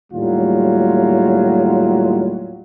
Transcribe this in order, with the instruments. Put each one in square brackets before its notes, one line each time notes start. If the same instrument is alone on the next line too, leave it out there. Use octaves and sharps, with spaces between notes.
[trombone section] D#2 A2 F#3 G3 F4